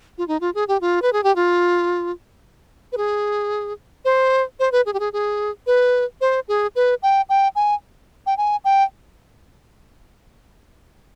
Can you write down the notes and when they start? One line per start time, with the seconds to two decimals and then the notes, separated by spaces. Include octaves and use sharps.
0.18 F4
0.28 D#4
0.41 F4
0.55 G#4
0.68 G4
0.81 F4
1.02 B4
1.13 G#4
1.24 G4
1.36 F4
2.92 B4
2.97 G#4
4.05 C5
4.60 C5
4.72 B4
4.86 G#4
4.94 G4
5.00 G#4
5.13 G#4
5.67 B4
6.21 C5
6.48 G#4
6.76 B4
7.03 G5
7.29 G5
7.55 G#5
8.26 G5
8.38 G#5
8.65 G5